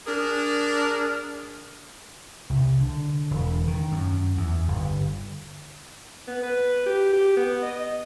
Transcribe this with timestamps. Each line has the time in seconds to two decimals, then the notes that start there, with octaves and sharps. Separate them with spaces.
0.07 D4 G#4 A#4
2.50 C2
2.80 D3
3.31 E1
3.68 D#3
3.92 F#2
4.37 E2
4.68 G1
6.28 B3
6.43 B4
6.86 G4
7.13 G4
7.37 B3
7.63 D#5